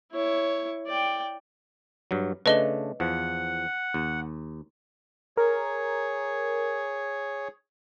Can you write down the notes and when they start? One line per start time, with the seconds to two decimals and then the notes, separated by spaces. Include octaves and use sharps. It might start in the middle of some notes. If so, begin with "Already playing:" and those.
0.12 E4 C#5
0.87 D5 G5
2.11 G2 F#3
2.46 C#3 A3 D4 B4 D#5 G7
3.00 E2 F3 F#5
3.94 D#2
5.37 G#4 A#4 C#5